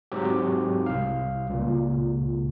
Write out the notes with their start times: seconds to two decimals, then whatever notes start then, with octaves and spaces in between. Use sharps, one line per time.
0.12 G#2 F#3 C4 G4
0.86 C2 F5
1.50 C#2 A#2